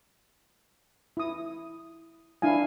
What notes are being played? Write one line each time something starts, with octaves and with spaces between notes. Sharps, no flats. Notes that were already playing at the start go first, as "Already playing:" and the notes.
E4 D#6
D4 E4 F5 G#5